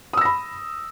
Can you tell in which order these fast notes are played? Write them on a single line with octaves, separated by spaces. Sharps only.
D#6 E6 A#6 B5